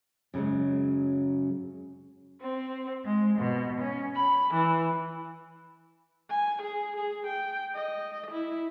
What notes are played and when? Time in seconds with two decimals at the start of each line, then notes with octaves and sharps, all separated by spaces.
0.34 F#2 C#3 F3 F#3 G#3
2.41 C4
3.04 G#3
3.39 B2
3.80 C#4
4.15 B5
4.53 E3
6.30 G#5
6.62 G#4
6.97 G#4
7.27 G5
7.75 D#5
8.31 E4